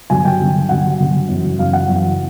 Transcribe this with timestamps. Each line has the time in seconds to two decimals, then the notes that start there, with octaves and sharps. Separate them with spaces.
0.10 G2 D3 F#3 G#5
0.25 G5
0.39 G2 D3 F#3
0.69 G2 D3 F#3 F#5
0.99 G2 D3 F#3
1.29 F#2 C#3 E3
1.59 F#2 C#3 E3 F5
1.73 F#5
1.88 F#2 C#3 E3